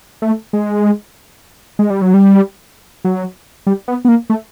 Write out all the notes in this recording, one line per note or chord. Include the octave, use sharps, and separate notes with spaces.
A3
G#3
G#3
G3
F#3
G3
F#3
G3
B3
B3
A#3
A3